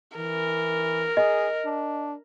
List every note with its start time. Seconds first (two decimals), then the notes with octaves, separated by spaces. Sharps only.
0.17 E3 A#4
1.17 G#4 D#5
1.65 D4